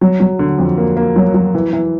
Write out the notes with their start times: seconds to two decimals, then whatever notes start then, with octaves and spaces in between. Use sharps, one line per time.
0.01 F#3
0.20 F#3
0.39 D3
0.58 F2
0.77 A#3
0.97 A#3
1.16 F#3
1.34 F#3
1.54 E3
1.73 E3